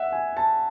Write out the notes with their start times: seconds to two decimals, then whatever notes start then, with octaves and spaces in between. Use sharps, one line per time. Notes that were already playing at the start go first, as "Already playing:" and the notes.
Already playing: E5 F#5
0.12 G#5
0.37 A5